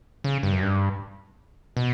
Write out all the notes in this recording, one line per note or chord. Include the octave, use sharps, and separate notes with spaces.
C#3
G2
F#2
G2
B2